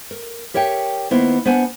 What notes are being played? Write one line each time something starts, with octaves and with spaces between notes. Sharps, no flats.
A#4
G4 A#4 C#5 E5 G5
D#3 A#3 B3 E4 C5
B3 D4 C5 F#5 G#5